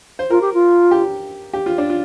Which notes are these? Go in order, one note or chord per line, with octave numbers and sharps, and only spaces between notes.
C5
F4 A#4
G4
F4
G4
G4
F4
D4
F4